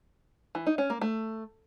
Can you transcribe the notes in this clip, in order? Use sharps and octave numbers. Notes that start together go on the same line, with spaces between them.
E3
D#4
C#4
A#3
A3